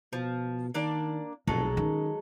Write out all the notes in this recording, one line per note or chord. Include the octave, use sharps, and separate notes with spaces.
B2 F3
D#3 A#3 D4 D5
F1 B1 F#3 G#3 A4
D#3 C#4